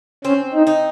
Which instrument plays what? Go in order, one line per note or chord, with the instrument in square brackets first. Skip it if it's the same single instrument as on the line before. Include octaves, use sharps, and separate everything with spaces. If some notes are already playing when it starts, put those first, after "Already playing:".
[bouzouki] C4 [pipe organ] C#4
[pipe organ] D#4
[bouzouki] D#4